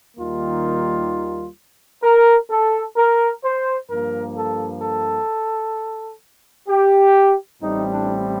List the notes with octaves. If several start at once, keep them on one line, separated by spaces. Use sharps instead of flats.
D#2 D#3 G3 A#3 F4
A#4
A4
A#4
C5
G2 F3 A#3 A#4
A4
A4
G4
A1 A2 G3 C4 D#4
D4